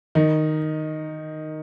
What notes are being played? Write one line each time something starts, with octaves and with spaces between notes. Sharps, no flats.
D#3 D#4